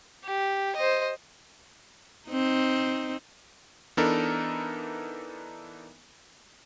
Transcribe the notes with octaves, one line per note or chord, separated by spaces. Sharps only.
G4
C5 D#5
C4 D#4
E3 B3 D4 D#4 A4 A#4